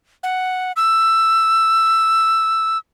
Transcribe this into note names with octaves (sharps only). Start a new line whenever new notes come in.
F#5
E6